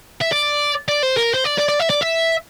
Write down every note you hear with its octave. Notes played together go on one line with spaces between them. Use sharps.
E5
D5
D5
C5
A#4
C5
D5
D5
D5
E5
D5
E5